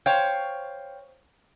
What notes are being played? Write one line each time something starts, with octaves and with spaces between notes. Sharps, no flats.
C5 C#5 F5 G5